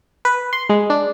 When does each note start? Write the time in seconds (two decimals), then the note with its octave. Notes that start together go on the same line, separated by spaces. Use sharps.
0.25 B4
0.53 C6
0.69 G#3
0.90 D4